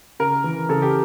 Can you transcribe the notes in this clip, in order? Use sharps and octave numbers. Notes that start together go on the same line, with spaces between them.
C#3 A#4
E3
C#3 A4
G4